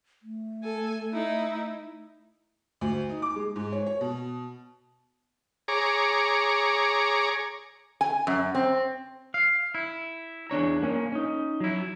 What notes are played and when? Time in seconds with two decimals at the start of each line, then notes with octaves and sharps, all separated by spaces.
0.23 A3
0.63 A4 G#5
1.13 D#4 E4
2.81 D2
3.09 D#4
3.22 D6
3.36 G#3
3.56 G#2
3.72 C#5
3.87 C#5
4.01 B2
5.68 G#4 C#5 A#5 D6
8.01 G#5
8.27 F#2
8.55 C4
9.34 F5
9.75 E4
10.50 E2 D4 C#5 A#5
10.82 A#3 C#4
11.12 C#4 D#4
11.60 F#3 E4